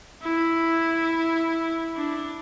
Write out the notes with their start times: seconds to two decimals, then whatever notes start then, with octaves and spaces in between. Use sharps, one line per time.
0.22 E4
1.96 D4